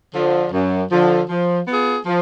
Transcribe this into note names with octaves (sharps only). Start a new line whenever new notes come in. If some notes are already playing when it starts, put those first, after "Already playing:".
D3 F3
F#2
D3 F3
F3
B3 F4 G#4
F3